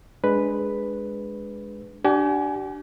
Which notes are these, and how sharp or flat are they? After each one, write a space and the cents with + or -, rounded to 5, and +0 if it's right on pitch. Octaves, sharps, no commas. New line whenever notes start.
G#3 +0 D4 +0 B4 +0
D4 +0 G4 -35 G#5 +20